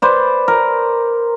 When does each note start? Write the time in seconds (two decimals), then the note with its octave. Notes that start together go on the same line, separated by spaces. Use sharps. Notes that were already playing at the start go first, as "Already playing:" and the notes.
0.02 B4 C5 D5
0.48 A#4